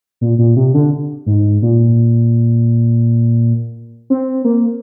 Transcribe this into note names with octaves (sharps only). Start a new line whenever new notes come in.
A#2
A#2
C3
D3
G#2
A#2
C4
A#3